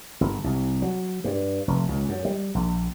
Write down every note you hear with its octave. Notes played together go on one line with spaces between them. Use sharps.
G1
C2
F#3
G2
F1
C#2
F#2
G3
A#1